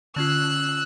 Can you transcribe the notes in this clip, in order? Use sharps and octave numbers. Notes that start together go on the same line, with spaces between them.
D3 C#4 F4 E6 F#6